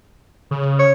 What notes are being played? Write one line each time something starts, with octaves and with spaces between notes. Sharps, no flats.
C#3
C#5